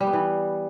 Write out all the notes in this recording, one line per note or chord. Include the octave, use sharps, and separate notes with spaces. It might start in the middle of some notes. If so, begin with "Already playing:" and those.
G3
B3
E3